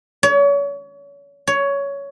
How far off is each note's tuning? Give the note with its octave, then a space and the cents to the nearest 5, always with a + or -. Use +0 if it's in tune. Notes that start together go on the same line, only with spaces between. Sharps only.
C#5 +35
C#5 +15